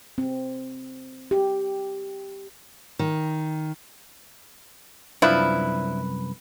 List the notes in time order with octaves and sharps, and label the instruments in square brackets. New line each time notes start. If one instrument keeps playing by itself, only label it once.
[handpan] C4
G4
[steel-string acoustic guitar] D#3
[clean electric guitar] C2 F#2 B4 [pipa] F3 D4 E4